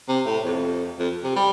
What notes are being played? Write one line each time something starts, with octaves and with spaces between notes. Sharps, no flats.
C3
A2
F2
F2
C3
G3